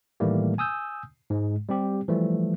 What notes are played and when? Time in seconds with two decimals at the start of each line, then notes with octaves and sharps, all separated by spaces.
0.20 A2 D#3 E3 G3 A3 A#3
0.58 G#5 D#6 E6 G6
1.30 G#2 G#3
1.69 G3 C4 G4
2.08 E3 F3 G3 A3